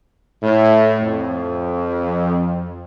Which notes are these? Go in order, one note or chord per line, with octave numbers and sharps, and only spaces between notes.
A2
F2